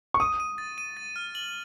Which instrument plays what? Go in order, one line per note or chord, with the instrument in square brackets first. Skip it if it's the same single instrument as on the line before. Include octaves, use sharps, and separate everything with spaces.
[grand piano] C#6
[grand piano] D#6 [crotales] D#7
[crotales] D#7
A6
D#7
A6
F6
F#7